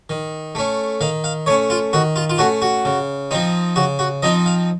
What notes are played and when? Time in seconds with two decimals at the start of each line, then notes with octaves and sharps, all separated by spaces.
0.10 D#3
0.55 A3 C#4
1.01 D#3 F5
1.24 F5
1.46 A3 C#4 C#5
1.70 F4
1.93 D#3 F#4
2.16 F4
2.30 F4
2.38 A3 C#4 F#4
2.62 F#4
2.85 C#3
3.31 F3 C4 D#4
3.76 C#3 F#4
3.99 F#4
4.23 F3 C4 D#4 D#5
4.46 F5